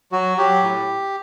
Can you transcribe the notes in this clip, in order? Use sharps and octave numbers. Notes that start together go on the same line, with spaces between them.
F#3 F#4
F#3 G4
A2